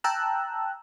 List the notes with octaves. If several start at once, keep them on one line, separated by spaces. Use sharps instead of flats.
G5 A5 A#5 E6 F#6